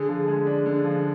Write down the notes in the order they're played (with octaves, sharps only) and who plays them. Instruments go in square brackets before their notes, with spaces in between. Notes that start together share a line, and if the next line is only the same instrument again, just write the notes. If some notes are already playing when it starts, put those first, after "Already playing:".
Already playing: [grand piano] D3 [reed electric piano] G#4
[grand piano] F3
G#3
D4
D3
F3